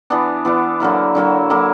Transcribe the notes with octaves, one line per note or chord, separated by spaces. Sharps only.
E3 B3 D4
E3 B3 D4
D3 F#3 A#3 E4
D3 F#3 A#3 E4
D3 F#3 A#3 E4